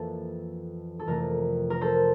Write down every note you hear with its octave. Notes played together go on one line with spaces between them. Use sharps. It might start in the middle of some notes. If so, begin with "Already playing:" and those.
Already playing: F2 E3 A#3 A4
A4
F2 C3 E3 A3 A#4
A#4
A4 C5